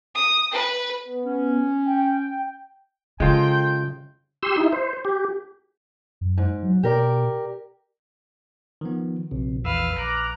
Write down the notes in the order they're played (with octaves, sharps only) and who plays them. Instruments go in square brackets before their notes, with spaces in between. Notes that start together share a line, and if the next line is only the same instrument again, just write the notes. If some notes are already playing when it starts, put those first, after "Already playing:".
[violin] D#6
B4
[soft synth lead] B3
[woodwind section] C#4
[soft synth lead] G5
[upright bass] C#3 [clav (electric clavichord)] G#3 F4 [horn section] A4 C5 G5
[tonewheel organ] G4 C6 E6
D#4 E4
C5
G4
[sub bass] F#2
[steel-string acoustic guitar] G#2
[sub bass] F#3
[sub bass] B2 [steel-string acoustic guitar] G4 A#4 D5
[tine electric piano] D#3 F3 B3
[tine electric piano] A#1 [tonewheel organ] C3
[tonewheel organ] E2 E6 [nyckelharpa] B4 F5
[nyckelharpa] A#5 [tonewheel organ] D6 F6 F#6